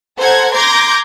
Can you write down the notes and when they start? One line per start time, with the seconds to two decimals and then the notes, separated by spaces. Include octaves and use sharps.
0.18 A4 C5 F#5 A#5 G#6
0.54 A#5 C6 D6 G6 G#6 A#6